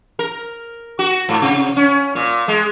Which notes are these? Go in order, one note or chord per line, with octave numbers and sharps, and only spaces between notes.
A#4
F#4
G#2
C3
C#4
A#2
G#3